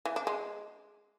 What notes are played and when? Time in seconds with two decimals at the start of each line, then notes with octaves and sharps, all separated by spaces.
0.05 E3
0.16 D4
0.27 G#3